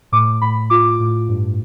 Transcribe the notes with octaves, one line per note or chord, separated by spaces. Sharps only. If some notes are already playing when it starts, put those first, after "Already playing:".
A2 D6
A2 B5
F4 D6
A2
G2